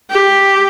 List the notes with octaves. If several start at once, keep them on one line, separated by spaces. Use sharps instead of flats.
G4